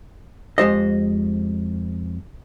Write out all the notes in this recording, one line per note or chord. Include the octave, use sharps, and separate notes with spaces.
F2 G#3 G4 C5 D#5